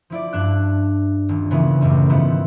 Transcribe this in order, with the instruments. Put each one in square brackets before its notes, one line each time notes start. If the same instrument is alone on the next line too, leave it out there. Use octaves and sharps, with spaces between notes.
[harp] F3 E4 D5
G2 D4 F#6
D#1
A#2 C#3 E3 B3 C#4 E4
C#2 F#2 A2 G3
G#2 D#3 F3 B3 E4